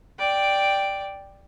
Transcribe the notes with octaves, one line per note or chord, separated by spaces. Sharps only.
D5 G5